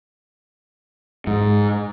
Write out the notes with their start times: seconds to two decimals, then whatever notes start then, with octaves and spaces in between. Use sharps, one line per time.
1.27 G#2